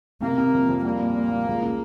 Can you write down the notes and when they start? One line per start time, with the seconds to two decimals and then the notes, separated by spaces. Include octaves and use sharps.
0.22 C3 A#3
0.38 C3
0.53 F2
0.68 F2
0.84 G3 A#3
1.00 A#2
1.15 A#2
1.32 G3
1.47 C#2
1.62 C#3